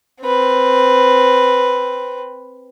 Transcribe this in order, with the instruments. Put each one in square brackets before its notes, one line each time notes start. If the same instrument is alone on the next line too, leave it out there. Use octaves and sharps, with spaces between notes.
[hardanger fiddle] C4 B4